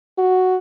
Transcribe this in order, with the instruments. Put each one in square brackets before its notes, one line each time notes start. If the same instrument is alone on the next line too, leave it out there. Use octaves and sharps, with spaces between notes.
[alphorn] F#4